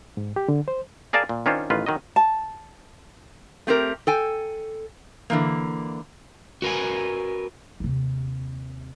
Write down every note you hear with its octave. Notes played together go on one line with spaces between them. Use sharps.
G#2
G4
D3
C5
G#4 A#4 D5 F5 G#5 A5
A#2
D#3 C#4 D4 F4 C5 C#5
A1 D#3 F4 B4
D#3 F#3 D#5
A5
A3 C4 G4 A#4
A4 G5 G#5
D3 E3 A#3
F#4 A#4 B4 G#5
D#2 C3